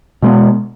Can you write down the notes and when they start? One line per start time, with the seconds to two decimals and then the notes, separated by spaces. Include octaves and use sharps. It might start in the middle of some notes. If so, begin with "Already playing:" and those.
0.22 B2 G#3 B3